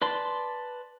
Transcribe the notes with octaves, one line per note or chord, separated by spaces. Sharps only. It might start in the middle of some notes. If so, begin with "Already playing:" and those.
B4 D5 A5 C6